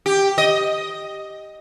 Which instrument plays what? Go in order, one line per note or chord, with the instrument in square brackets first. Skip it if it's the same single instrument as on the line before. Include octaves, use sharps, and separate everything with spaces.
[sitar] G4
D#5